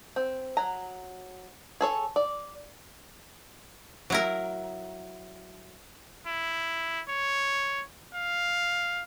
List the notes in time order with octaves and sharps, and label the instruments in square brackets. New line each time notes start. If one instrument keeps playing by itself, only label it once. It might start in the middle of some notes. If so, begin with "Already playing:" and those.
[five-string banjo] C4
F#3 A#5
G#4 A4 C#5
D5
[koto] F#3 E4 A#4
[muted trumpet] E4
C#5
F5